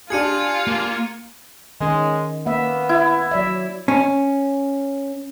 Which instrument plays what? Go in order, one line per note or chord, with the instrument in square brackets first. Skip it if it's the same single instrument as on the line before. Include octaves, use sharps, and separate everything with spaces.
[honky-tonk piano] D4 G4 G#4 [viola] F4 [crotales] G#6 C#7 D#7
[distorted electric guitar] A#3
[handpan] D#3 C#4 [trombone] G#3
[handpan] A#3 E5 [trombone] B3
[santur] E4
[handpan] F#3 D5 E5
[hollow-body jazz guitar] C#4